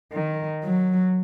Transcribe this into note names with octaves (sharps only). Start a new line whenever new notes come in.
D#3
F#3